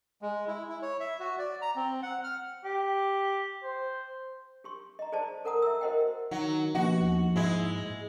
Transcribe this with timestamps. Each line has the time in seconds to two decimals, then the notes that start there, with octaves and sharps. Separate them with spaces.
0.22 G#3
0.47 E4
0.68 E4
0.82 C#5
1.00 E5
1.19 F#4
1.38 D5
1.62 A#5
1.76 C4
2.03 F#5
2.24 F6
2.64 G4
3.63 C5
4.64 G4 C6 C#6
4.99 D#5 A#5
5.12 G#4 C5 D5 D#5 A5
5.45 A4 A#4 F#5 A#5 D#6
5.62 E5 A#5 E6
5.81 F#4 A#4 C5 D#5 F#5 G5
6.31 D#3 F#3
6.75 B2 F3 A#3 F#4
7.01 D#2
7.36 G#2 G#3 E4